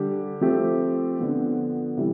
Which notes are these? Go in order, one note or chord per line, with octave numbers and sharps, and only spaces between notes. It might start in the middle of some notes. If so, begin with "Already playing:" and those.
Already playing: D3 G3 D4 G4
F3 A3 C4 G4
D3 F3 B3
C3 E3 G3 E4